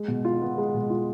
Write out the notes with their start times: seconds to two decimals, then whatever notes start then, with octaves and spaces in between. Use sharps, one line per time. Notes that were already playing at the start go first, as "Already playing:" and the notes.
Already playing: G#3
0.08 B2
0.25 F4
0.42 B3
0.58 G#3
0.74 B2
0.90 F4